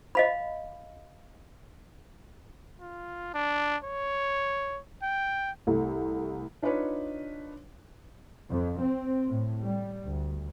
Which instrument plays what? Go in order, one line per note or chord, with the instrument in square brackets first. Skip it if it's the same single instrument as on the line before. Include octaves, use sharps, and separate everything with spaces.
[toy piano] D#5 F5 B5
[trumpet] F4
D4
C#5
G5
[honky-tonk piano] C2 A3
[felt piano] D4 D#4 F4 B4 C#5
[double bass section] F2
C4
A2
G3
D2